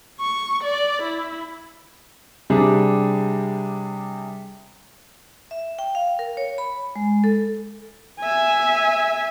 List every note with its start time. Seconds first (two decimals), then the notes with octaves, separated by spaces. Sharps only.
0.20 C#6
0.64 D5
1.03 E4
2.50 C3 G3 D4 G#4
5.51 E5
5.79 G5
5.95 F5
6.19 A#4
6.37 C#5
6.58 B5
6.96 G#3
7.24 A4
8.20 E5 G#5